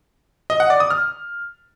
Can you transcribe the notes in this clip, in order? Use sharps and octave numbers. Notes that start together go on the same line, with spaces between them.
D#5
F#5
D5
D#6
F6